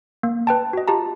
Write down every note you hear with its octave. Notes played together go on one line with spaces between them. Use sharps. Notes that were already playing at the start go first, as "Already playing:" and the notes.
A#3
B4 G5 A5
F#4 D#5
F4 G4 A5 A#5